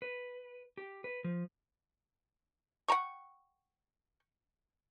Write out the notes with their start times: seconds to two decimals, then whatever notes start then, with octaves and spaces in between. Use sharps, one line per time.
0.02 B4
0.77 G4
1.04 B4
1.24 F3
2.88 F#5 G5 A#5 C#6